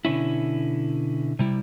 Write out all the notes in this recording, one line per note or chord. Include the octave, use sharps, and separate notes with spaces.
B2 D3 C#4 E4
C3 G3 E4